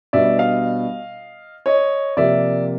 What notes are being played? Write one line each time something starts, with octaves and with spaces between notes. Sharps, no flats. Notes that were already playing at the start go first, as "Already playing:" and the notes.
B2 G3 B3 D4 D5 E5
D#5 F5
C#5 D#5
C3 F3 A#3 D5 E5